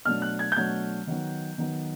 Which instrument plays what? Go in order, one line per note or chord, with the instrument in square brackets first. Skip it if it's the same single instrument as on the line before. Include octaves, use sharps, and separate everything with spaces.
[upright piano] B2 F#3 A3 D4 F6
F#6
G#6
G6
B2 F#3 A3 D4 G#6
D#3 F#3 B3 D#4
D#3 F#3 B3 D#4